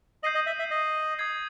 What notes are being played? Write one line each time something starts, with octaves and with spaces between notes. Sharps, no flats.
D#5 G6 C7 D#7 F#7
D#5
E5
E5
D#5
D#6 G#6 C7